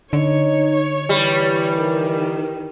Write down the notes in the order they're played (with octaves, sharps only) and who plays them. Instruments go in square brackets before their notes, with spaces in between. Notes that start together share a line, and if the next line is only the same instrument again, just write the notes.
[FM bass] D3 [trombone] D#4 [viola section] C#5
[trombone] E3 [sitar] G3
[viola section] D#3